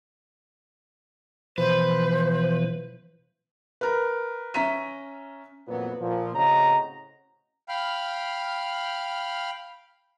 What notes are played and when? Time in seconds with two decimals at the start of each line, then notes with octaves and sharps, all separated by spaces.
1.58 B2 E3 F3 B4 C5
3.81 A#4 B4
4.54 C#4 E5 A#5 B6 D#7
5.68 F2 A#2 E3 F#3 B3
6.00 A#2 F3
6.34 A2 C#3 C4 F#4 D#5 A#5
7.69 F5 G5 B5 F6